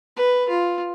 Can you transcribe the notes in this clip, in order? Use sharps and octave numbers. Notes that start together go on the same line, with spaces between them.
B4
F4